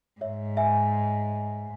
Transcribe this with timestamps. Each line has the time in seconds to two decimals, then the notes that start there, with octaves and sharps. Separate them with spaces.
0.21 G#2 C#5 E5
0.57 E5 G#5